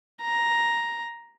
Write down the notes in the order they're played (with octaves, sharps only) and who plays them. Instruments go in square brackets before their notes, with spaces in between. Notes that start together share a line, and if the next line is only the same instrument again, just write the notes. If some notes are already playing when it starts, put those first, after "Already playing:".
[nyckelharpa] A#5